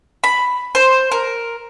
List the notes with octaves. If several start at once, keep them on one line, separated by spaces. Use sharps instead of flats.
B5
C5
A#4